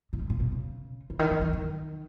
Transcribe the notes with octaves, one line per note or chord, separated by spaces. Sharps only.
A#2
G#2
A#2
B2
C#3
C#3
D#3
E3
E3
D#3